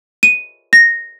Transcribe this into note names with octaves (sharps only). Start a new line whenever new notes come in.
D#7
A#6